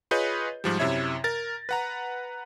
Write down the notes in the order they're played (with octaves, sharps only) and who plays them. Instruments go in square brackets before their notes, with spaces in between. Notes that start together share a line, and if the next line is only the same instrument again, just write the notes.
[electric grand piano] F4 G#4 B4 C#5 D#5 G6
G#2 F3 G3
F#2 C3 E4 C#5 E5 G#6
A#4 A6 A#6
B4 F#5 A#5